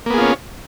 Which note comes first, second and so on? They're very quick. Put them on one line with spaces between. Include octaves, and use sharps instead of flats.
A#3 B3 G#4 F4 C#4